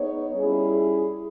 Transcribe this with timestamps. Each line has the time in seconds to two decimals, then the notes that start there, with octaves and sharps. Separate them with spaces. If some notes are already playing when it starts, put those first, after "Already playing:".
Already playing: B3 D#4 G#4 C#5
0.32 G3 C#4 E4 G#4